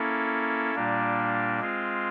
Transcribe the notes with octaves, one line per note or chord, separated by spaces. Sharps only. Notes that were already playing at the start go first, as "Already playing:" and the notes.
Already playing: A#3 C#4 E4 A4
A#2 G3 A#3 D4
G#3 C4 F4